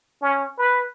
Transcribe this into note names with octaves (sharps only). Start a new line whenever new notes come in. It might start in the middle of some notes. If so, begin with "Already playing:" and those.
C#4
B4